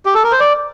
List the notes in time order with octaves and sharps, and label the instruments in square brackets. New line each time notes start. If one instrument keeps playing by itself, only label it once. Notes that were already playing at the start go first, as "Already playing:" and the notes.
[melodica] G4
A4
A#4
C5
D5